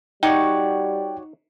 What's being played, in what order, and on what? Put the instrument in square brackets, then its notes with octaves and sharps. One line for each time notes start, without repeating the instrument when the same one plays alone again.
[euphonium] G3 [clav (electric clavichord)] D#4 [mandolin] F#4 C#5 D5 [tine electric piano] G5